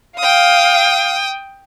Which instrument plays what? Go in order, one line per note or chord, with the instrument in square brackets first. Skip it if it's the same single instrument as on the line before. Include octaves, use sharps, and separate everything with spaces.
[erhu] F5 [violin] G5 D#6